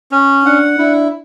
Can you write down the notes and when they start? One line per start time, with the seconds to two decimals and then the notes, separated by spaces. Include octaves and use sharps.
0.11 C#4
0.45 D4 F#5
0.78 D4 E4